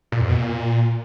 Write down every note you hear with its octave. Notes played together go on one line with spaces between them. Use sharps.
A#2
F2
B2
A#2